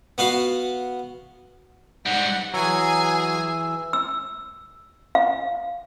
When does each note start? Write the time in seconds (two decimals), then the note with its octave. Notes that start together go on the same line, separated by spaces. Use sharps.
0.18 B3 F#4 F5
2.06 G#2 G3 F#5
2.54 E3 F#3 G#4 G#5 E6
3.93 E6
5.15 F5